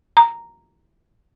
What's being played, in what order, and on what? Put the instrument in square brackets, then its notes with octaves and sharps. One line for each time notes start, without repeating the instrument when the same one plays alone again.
[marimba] A#5